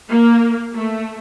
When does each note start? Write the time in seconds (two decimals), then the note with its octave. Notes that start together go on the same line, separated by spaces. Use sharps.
0.09 A#3
0.73 A3